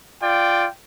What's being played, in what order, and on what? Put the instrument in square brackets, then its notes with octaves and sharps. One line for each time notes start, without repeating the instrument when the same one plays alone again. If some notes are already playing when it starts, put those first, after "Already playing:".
[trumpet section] F4 D5 G5